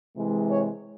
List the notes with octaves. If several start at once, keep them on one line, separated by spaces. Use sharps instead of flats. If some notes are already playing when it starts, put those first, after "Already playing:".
C3 E3 G#3
C#5